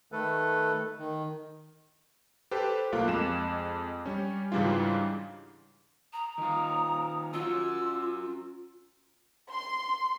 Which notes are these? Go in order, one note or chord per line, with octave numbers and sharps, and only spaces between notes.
D#3 A3 A4 B4
D#3
G4 A4 B4 C5
B1 A3 A#3 F4 D6 F#6
F2 G#3 E7
G3 C#4
G#2 C#3 E3 G3 D4 F4
A#5 D#6
D#3 F4
C#4 F4 F#4 F#5 E6
C6